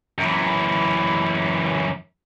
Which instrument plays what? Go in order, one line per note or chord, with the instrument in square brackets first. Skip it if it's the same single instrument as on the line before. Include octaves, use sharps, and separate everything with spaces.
[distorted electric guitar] F#2 E3